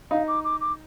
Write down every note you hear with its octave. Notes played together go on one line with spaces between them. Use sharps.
D#4 F5
D6
D6
D6